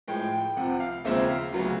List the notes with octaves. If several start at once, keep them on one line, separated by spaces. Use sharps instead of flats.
A2 F3 G#3 G5
G5
C2 C3 F3 F#5
F5
D#2 C#3 F3 G#3 C4 E5
F5
D2 C#3 F#3 B3